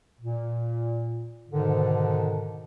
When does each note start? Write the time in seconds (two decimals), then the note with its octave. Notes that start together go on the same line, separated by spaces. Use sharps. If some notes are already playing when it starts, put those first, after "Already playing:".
0.20 A#2
1.49 G#2 B2 D3 D#3